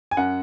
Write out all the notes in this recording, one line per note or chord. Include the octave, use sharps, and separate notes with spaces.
G#5
F#2 F#5